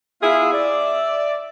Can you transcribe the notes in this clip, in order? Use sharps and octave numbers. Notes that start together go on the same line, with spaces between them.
B3 E4 F4 G#4 E5 F5
D5 E5